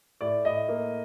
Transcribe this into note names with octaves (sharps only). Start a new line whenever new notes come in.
A2 D5
A2 D#5
A#3